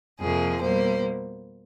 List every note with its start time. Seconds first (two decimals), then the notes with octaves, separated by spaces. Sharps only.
0.20 F2 C3 F3 A#3 G#4
0.61 B2 G3 A#3 C5